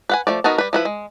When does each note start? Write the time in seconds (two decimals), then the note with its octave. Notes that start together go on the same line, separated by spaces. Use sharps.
0.09 B4 F#5 G#5
0.27 F3 A3 D5
0.44 B3 D#4 F#4 A#4 A5
0.58 G3 B4
0.73 F3 E4 B4
0.85 G#3